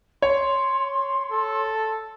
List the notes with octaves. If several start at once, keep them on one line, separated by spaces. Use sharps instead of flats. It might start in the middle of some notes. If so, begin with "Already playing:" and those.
C#5 C6
A4